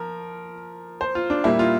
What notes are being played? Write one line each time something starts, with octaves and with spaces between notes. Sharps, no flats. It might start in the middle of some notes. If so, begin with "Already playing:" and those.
Already playing: F3 A#4
C5
F4
D4
A#2 G3 A#3 E4
F4